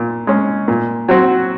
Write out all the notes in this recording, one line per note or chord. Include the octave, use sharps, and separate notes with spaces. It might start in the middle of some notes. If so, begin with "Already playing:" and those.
Already playing: A#2
G#3 C#4
A#2
F#3 C4 F#4